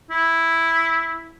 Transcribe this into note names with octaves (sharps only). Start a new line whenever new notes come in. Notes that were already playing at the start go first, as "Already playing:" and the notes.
E4